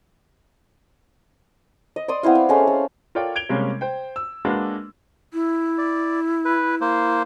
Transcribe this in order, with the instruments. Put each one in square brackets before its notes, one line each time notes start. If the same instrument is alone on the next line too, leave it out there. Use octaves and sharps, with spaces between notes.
[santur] D#5
D5 C6 D#6
B3 C4 E4 F5
F5
G#3 A3 C#4 C6
A4
[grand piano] F4 A4 A#4 C#5 D5 G5
G#6 D7 F7 G7
C3 G3 G#3 A#3 C#4
C5 G5
E6
G#3 A#3 D4 F#4 B4
[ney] E4
[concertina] D5
B4
A#3 C5